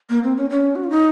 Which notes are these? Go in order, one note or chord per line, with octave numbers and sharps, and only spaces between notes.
A#3
C4
C#4
C#4
F#4
F4
D#4